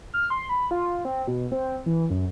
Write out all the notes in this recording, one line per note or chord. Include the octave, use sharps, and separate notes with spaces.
F6
C6
B5
F4
C4
B2
C4
E3
F#2